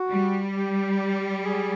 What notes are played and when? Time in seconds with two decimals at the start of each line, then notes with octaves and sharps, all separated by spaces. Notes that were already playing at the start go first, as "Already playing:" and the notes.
Already playing: F#4
0.10 G3
0.55 G4
1.44 G#4